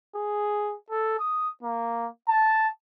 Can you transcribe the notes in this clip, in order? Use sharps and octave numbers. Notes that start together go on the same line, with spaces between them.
G#4
A4
D#6
A#3
A5